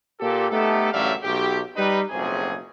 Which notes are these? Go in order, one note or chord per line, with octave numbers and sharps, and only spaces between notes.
A#2 G4 A4
A3 B3 D#4 G4 A4
A1 F#2 D3 G3 E5 F5
B1 G4
G3 D#4 B4
F#1 B1 F2 C3 G#4